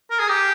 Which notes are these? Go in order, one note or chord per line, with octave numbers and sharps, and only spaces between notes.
A#4
G#4
G4